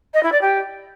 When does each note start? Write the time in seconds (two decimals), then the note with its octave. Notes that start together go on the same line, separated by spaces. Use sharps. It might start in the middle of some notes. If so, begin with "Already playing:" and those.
0.14 D#5
0.23 E4
0.32 D5
0.41 G4